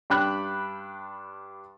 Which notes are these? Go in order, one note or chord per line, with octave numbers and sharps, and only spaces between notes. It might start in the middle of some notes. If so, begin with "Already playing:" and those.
G2 D4 G5 B5 F#6